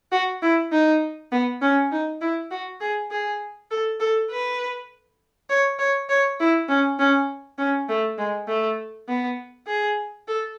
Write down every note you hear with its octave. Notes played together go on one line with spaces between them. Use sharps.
F#4
E4
D#4
B3
C#4
D#4
E4
F#4
G#4
G#4
A4
A4
B4
C#5
C#5
C#5
E4
C#4
C#4
C#4
A3
G#3
A3
B3
G#4
A4